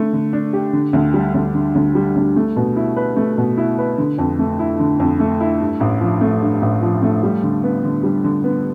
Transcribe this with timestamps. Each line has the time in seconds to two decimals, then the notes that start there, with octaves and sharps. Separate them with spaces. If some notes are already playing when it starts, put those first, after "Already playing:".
Already playing: D3 A3
0.13 D3
0.33 D4
0.53 G4
0.73 D3
0.93 D2
1.14 G3
1.34 D2
1.54 D3
1.75 D2
1.95 G3
2.16 D2
2.36 A3
2.56 B2
2.76 E4
2.96 B4
3.16 A3
3.38 B2
3.57 E4
3.78 B4
3.98 D3
4.18 F2
4.39 A3
4.59 E4
4.79 D3
5.00 F2
5.20 A3
5.41 E4
5.61 G2
5.80 A1
6.01 F3
6.21 A3
6.41 G2
6.62 A1
6.82 F3
7.03 A3
7.23 G3
7.43 D3
7.63 B3
7.83 D3
8.03 G3
8.24 D3
8.44 B3